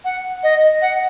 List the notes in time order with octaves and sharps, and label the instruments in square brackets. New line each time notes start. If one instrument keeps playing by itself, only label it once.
[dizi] F#5
D#5
F#5